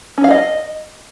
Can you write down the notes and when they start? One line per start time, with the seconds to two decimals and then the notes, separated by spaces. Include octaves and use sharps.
0.18 C#4
0.24 F5
0.31 D#5